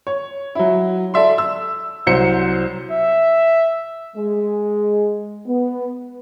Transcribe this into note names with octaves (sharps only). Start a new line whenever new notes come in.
C#5
F#3 E4
A4 D5 E5 C6
E6
C2 F#3 C5 C#7
E5
G#3
B3